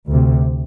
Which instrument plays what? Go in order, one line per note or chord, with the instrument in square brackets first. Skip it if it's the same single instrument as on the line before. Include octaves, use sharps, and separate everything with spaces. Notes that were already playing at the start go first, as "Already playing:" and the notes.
[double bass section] D2 C3